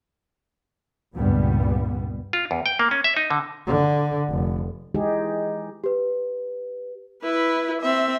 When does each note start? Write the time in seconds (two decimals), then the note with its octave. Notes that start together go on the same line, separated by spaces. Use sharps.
1.15 C#2 G2 A#2 G3 B3
2.33 F4
2.51 E2
2.66 G5
2.79 A#3
2.91 C#4
3.04 E5
3.17 D#4
3.30 D3
3.67 D3
4.29 F1
4.94 E3 G#3 D#4 G4 G#4 D#5
5.84 G4 B4
7.23 E4 B4
7.81 C4 E5